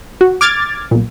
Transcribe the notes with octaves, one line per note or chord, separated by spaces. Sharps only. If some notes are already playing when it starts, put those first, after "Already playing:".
F#4
D6 F6 G#6 A6
B1 A#2